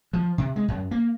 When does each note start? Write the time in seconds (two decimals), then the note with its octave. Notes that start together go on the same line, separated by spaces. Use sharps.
0.13 F3
0.38 C3
0.56 G#3
0.68 F#2
0.91 A#3